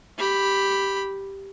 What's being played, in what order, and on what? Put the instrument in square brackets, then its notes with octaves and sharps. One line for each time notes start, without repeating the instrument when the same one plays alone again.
[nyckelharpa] G4 B5